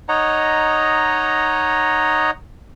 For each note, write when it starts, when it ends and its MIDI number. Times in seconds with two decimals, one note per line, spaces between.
0.09 2.31 63
0.09 2.31 73
0.09 2.31 75
0.09 2.31 78
0.09 2.31 82